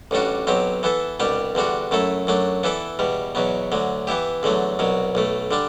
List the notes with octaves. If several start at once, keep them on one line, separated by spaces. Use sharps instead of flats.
A1 A2 G3 D4 F#4
B1 B2 F#3 C4 G4
E3 B3 E4 A4
C2 B2 G3 D4 G4
E2 D3 G3 D4 F#4
F#2 F#3 A3 E4 A4
F#2 F#3 A3 D4
E3 B3 E4 A4 D5
E2 B2 G3
E2 B2 F#3 B3
D2 D3 F#3
E3 B3 E4 G4
E2 D3 F#3 A3
C2 B2 F#3
B1 B2 A3
D3 G3 D4